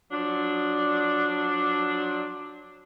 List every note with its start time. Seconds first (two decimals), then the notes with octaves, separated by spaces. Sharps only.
0.12 F3 F#3 D4